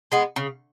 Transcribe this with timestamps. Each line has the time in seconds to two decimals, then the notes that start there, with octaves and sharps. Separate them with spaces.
0.12 G#3 B3
0.36 C#3